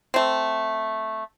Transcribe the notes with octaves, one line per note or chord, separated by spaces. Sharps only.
A3 C4